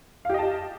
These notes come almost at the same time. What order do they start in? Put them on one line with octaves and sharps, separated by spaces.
F5 G4 D#5 A5